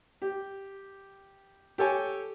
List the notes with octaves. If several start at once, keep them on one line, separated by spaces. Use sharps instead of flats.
G4
G4 A4 C#5 G#5